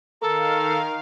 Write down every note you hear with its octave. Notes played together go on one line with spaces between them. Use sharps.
D#3 A4 A#4 F5